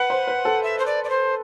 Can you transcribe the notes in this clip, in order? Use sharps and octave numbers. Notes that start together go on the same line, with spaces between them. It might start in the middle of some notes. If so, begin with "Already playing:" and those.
Already playing: B4 F#5
C5
B4
A4
E5
C5
D5
D5
C5